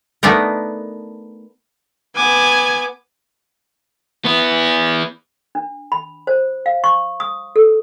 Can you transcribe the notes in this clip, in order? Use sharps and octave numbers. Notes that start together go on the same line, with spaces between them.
A3 B3 D4 D#4 A#4
B3 G#5 D6
B3 E4
D4
B5
C5
F5
C#6
D#6
A4